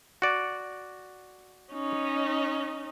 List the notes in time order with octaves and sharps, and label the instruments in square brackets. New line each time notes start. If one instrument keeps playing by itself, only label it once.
[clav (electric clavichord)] F#4 D5
[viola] C#4 D#4